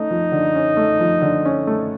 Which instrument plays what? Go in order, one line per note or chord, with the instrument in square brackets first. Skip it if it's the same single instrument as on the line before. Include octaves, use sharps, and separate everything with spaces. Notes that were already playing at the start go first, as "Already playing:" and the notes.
Already playing: [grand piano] A3 C#4 [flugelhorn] D#4
[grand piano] F3
D3
C#4
A3
F3
D3
C#4
A3